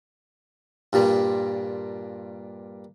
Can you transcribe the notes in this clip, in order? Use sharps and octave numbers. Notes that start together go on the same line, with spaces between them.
G2 A#2 G3